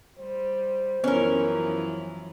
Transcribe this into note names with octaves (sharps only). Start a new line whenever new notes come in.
G3 C5
F#2 E3 F3 B3 C#4 A#4 C#5